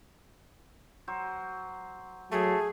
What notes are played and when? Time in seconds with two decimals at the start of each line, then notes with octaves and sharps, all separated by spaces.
1.08 F#3 C5
2.32 F#3 A3 G#4